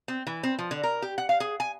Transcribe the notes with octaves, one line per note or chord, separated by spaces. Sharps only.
C4
E3
C4
F3
D3
A#4
G4
F#5
F5
G#4
G#5